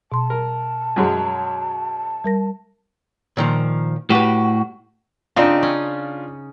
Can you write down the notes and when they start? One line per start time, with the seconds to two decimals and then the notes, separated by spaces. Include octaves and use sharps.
0.12 B2 A5 C6
0.30 A#4
0.96 F#2 F#3 G#3
2.24 G3 A#4 A#6
3.37 A#2 D#3 F3
4.10 A2 F#4 G4 B4
5.36 C#3 C4 D4 D#4 F4
5.63 C#4